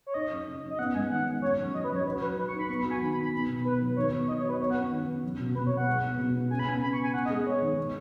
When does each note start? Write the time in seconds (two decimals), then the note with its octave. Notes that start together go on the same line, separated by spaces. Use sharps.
0.07 C#5
0.14 D#4 D#5
0.30 F#2
0.47 C#3
0.63 F#2
0.70 D#5
0.79 B3 F#5
0.94 G#2 G#5
1.10 D#3 F#5
1.26 D#3
1.42 F#2 C#5
1.58 F#3
1.74 F#2 D#5
1.84 B4
1.90 F#3 C#5
2.06 F#4 B4
2.21 F#3 B4
2.37 F#4 B4
2.48 C#6
2.53 D#4
2.59 B5
2.68 B3 C#6
2.79 B5
2.85 F#4
2.90 G#5
3.01 D#3 B5
3.11 B5
3.16 D#4
3.22 B5
3.33 B3 B5
3.49 B2
3.65 B3 B4
3.81 F#3
3.96 D#3 C#5
4.12 B3
4.28 D#3 D#5
4.38 C#5
4.44 F#4
4.49 B4
4.60 B3 C#5
4.70 F#5
4.76 F#2
4.91 D#3
5.08 F#2
5.24 F#3
5.40 B2
5.55 B2 B4
5.66 C#5
5.71 B2
5.77 F#5
5.87 G#3
6.03 B3
6.19 B2
6.35 B3
6.50 C#3 G#5
6.59 B5
6.66 B3 G#5
6.82 C#3 B5
6.93 C#6
6.98 C#3 G#5
7.14 B3 F#5
7.25 D#5
7.30 G#3
7.46 G#3 C#5
7.62 D#3
7.78 B3